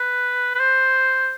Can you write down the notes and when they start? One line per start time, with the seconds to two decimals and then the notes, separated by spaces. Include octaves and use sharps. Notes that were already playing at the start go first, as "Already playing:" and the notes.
Already playing: B4
0.55 B4
0.59 C5